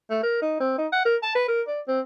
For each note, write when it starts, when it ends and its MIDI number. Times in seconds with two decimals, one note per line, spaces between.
0.10 0.18 57
0.23 0.38 70
0.42 0.58 63
0.60 0.73 60
0.78 0.87 63
0.92 1.02 78
1.05 1.17 70
1.23 1.33 81
1.35 1.45 71
1.48 1.62 70
1.67 1.81 74
1.88 2.00 60